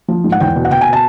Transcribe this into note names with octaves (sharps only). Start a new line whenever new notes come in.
F3
G#2
F#5
E2 G5
B2
F#5
B2 G5
G#5
B2
A5